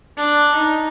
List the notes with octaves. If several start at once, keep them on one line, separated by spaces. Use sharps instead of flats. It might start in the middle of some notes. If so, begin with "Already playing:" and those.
D4
D#4